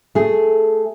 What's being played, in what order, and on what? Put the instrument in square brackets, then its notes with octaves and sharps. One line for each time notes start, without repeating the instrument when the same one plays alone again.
[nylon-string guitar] A3 G#4